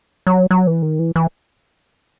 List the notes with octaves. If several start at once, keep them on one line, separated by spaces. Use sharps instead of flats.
F#3
F#3
E3
D#3
E3
E3